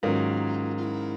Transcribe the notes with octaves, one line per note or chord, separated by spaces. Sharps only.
G#2 D#3 F#3 A#3 C#4 F4
F4
E4